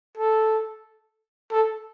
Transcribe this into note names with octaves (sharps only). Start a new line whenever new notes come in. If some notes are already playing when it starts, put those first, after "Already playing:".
A4
A4